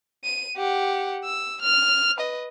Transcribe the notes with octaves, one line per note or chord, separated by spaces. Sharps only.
D#7
G4 F#5
E6
F6
B4 D#5